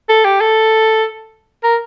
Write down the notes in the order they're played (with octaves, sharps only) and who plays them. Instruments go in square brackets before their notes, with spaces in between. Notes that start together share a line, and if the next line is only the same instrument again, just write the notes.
[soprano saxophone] A4
G4
A4
A#4